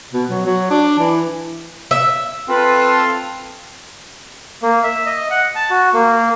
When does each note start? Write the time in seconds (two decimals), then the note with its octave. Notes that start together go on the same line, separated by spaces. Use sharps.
0.13 B2
0.29 F#3
0.46 F#3
0.70 D4
0.99 E3
1.91 E5
2.49 C4 F4 A4 B4
4.63 A#3
4.83 E5
5.06 D#5
5.30 F#5
5.55 A5
5.70 F#4
5.94 A#3